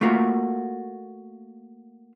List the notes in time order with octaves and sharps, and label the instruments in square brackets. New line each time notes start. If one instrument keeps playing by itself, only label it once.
[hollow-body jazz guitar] A3 A#3 F4 F#4